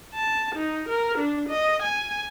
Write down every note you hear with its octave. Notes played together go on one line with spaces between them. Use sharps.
A5
D#4
A#4
D4
D#5
G#5